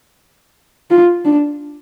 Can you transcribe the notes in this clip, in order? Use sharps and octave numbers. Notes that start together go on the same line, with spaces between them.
F4
D4